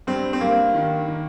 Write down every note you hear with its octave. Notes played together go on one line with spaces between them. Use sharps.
G2 C4
C4
G2 A#3
D#3
D#3